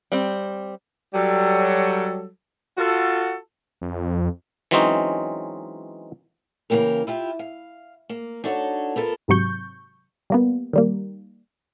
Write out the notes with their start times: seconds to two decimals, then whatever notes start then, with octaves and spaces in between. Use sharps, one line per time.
0.12 G3 C4
1.14 F#3 G3 A4
2.77 F4 F#4 A4
3.82 F2
4.71 E3 F#3 G#3 C4 C#4 D#4
6.70 C#3 E3 A#3 G4 A#4
7.07 E4 F4 G4
7.39 F5
8.09 A#3
8.44 D4 D#4 F#4 A4 C5 C#5
8.96 B3 F4 A4 A#4
9.28 G#1 G#2 C3 F#3 C#6 G6
10.30 G3 A#3 B3
10.73 D#3 G3 A#3